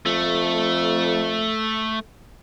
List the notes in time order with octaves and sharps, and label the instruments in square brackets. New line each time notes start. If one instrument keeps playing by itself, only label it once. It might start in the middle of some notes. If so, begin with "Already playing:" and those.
[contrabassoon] F2 [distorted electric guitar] A3